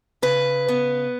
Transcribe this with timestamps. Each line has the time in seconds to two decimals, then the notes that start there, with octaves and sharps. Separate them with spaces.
0.22 C#3 B4
0.68 B3